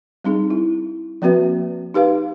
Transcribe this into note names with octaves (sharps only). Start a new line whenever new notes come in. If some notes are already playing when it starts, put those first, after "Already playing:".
G3 C4 D#4 G#4
E4
F3 A#3 C4 F#4 B4 E5
D#4 G4 B4 F5